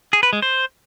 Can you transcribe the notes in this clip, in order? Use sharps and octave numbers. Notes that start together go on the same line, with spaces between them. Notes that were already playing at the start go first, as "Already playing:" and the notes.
G#4
B4
G#3
C5